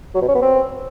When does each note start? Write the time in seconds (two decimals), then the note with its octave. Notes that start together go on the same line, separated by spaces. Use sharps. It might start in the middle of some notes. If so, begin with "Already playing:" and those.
0.15 F#3
0.22 B2
0.28 C#4
0.35 B3
0.42 C4